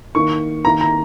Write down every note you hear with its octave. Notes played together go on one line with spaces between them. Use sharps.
D#3 A#3 C#6
D#3 A#3 A#5
A#5